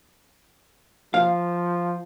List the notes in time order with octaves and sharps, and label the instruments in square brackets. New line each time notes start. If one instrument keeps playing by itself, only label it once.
[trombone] F3 [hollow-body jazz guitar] F5